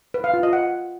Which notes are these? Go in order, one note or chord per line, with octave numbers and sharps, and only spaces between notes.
B4
F5
F4
D#5
F#5